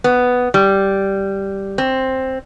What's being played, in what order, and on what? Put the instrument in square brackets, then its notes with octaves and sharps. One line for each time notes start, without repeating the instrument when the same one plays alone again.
[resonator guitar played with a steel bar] B3
G3
C4